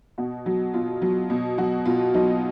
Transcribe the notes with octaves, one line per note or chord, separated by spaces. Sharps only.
B2 F#4
F#3
B2 F4
F#3
B2
F#3 F#4
B2 F4
F#3 D#4